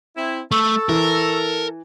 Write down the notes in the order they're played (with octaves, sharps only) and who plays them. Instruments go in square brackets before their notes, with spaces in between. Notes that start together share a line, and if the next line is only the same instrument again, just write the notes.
[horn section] C4 E4
[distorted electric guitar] A3 [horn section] A4 [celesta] C#6 E6
[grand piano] E3 [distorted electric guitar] A#4